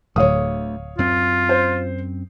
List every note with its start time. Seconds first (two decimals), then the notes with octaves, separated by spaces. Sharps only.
0.16 D1 G#1 D2 A3 C#5 F5 D#6
0.98 F#2 C4 F4
1.49 C5